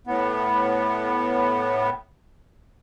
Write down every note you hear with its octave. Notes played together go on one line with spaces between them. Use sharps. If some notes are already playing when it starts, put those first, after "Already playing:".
A2 B3